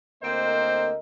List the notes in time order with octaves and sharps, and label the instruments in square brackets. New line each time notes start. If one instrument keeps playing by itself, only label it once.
[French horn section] D2 A#4 D#5 [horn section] A#3 C4 C5